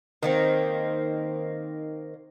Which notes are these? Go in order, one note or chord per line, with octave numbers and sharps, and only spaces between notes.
D#3 A#3 C4